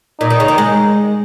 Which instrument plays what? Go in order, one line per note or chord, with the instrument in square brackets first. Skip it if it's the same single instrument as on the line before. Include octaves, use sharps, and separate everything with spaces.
[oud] A#2 [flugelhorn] D#4
[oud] D#3
C#3
D#3
G#3